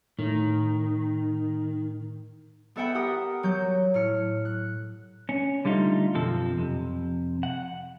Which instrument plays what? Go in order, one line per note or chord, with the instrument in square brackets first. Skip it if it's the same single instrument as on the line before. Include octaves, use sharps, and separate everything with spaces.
[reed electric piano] A2 [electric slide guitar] D#3
[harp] B3 A4 E5 F#5 G5 B5
G4 A#4 F#5 D#6
F#3 G6
A2 F6 C#7
F#6
[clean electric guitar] C#4
D3 G3 A3 D#4 F4
B1 F#2 F3 C4 A4
F2 C3
F#5